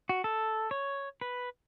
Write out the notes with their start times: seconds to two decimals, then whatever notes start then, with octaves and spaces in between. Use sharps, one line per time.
0.09 F#4
0.24 A4
0.71 C#5
1.21 B4